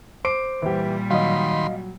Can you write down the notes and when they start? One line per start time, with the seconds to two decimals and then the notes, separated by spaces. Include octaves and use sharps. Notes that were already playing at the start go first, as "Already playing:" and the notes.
0.25 C5 D6 C7 D7
0.62 A#2 E3 G3 G4
1.11 D#3 F#3 D#5 F5 B5 C6